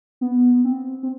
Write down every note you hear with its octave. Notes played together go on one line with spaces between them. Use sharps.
B3
C4
C4